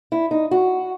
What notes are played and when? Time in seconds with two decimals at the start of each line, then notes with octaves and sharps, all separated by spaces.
0.12 E4
0.31 D#4
0.51 F#4